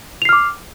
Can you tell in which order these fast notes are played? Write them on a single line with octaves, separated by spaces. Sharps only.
F7 C7 F6 D6